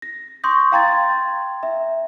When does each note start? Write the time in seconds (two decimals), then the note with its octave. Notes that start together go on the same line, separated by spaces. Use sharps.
0.02 A#6
0.44 C6 C#6 D#6 G6 A#6
0.72 F5 G5 A#5 C6 G#6 A6
1.63 E5